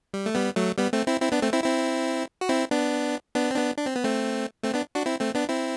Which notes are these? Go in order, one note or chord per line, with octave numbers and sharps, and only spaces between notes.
G3
A3
G3 B3
F#3 A3
G3 B3
A3 C4
C4 E4
C4 E4
B3 D4
A3 C4
C4 E4
C4 E4
F#4
C4 E4
B3 D4
B3 D4
C4
B3 D4
D4
C4
B3
A3 C4
A3 C4
B3 D4
D4 F#4
C4 E4
A3 C4
B3 D4
C4 E4